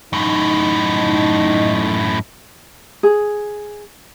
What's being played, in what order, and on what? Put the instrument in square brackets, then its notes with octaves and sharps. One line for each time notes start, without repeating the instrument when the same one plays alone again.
[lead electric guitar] F#2 A2 [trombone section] D#4
[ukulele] G#4